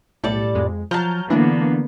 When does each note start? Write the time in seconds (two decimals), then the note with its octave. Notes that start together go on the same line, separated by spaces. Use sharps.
0.24 B1 A2 G3 A4 D5
0.55 F2 G#3
0.91 F3 F#3 A5 A#5 F6 G6
1.30 D3 E3 A#3 B3 D4